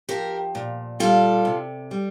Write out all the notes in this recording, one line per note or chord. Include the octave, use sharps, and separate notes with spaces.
F3 G4 A#4
A#2
G3 F4 A4
C3
G3